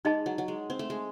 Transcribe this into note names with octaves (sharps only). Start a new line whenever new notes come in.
G#3 D#4 G#4 D#5 A5
F#3
F#3
G#3
C4
A3
G#3